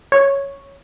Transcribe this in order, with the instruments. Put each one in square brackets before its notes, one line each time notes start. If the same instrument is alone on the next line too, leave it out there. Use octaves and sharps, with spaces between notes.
[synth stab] C#5